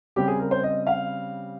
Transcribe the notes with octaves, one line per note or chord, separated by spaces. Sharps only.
C#3 G3 C4 G4
G#4
A#4
C5
D#5
F5